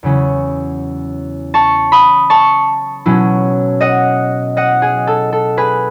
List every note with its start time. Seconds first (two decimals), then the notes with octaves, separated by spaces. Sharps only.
0.03 E2 C#3 F#3 C#4 E4
1.54 A5 C#6
1.92 B5 D#6
2.30 A5 C#6
3.06 B2 F#3 C#4 E4
3.81 D#5 F#5
4.57 D#5 F#5
4.82 G#4
5.07 A4
5.33 A4
5.57 G#4 B4